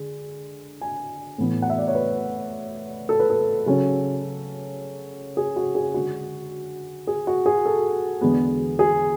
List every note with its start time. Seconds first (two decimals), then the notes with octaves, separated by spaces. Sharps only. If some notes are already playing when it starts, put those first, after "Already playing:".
Already playing: D3 G#3
0.81 G#5
1.38 A2 E3 B3
1.62 F#5
1.70 E5
1.78 D5
1.88 C#5
1.95 B4
3.09 A4
3.20 B4
3.30 A4
3.66 C#3 F#3 C#4
5.37 G#4
5.56 F#4
5.75 G#4
5.94 D3 G#3 D4 F#4
7.07 G#4
7.27 F#4
7.46 G#4
7.66 A4
8.21 E2 D3 G#3 B3
8.79 G#4